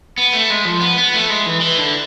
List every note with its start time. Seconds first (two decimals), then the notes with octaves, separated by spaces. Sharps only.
0.18 B3
0.33 A3
0.50 G#3
0.65 F3
0.81 B3
0.98 B3
1.14 A3
1.30 G#3
1.46 E3
1.61 E3
1.78 D3